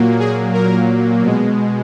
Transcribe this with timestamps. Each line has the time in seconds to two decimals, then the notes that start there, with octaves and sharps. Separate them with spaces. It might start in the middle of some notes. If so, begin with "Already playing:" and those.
Already playing: A#2 F#3 A#3
0.20 G#4
0.54 A#4
1.22 B2 G#3